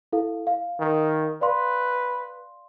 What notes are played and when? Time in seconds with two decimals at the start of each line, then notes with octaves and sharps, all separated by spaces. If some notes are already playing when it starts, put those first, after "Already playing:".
0.13 E4 A4 F5
0.47 F5
0.80 D#3
1.41 B4 D5 F5 C6